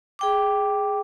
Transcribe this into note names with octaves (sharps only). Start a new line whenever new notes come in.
G#4 G5 D6